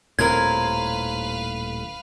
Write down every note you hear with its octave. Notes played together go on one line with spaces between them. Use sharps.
D#1 A2 C4 A#4 B4 F5 G#6